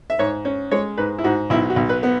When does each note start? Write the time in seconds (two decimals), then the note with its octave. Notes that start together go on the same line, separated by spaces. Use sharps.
0.10 E5
0.19 G#2 C#5
0.45 C#4
0.71 G#3 C#5
0.97 G#2 B4
1.18 E4
1.24 G#2 F#4
1.50 B1 E4
1.70 F#4
1.76 B1
1.89 B4
2.03 B3